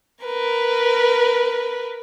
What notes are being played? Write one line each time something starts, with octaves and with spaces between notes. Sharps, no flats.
A#4 B4